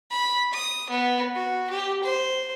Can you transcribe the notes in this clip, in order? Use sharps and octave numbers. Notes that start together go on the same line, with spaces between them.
B5
D#6
B3
F#4
G4
C5